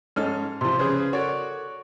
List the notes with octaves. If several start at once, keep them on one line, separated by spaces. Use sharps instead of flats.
G#2 C#4 D#4 A4 F6
C3 F3 C6
C#3 G#4 B4 C5
F#4 A4 A#4 C#5 D5